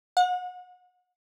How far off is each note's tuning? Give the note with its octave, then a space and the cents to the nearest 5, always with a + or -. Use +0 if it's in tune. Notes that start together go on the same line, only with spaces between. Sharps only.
F#5 -35